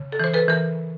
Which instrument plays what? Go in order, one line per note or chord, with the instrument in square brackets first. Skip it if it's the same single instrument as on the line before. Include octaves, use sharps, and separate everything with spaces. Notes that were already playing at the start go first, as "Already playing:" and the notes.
Already playing: [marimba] C#3
A4
E3 C5
A4 B4
E3 A#4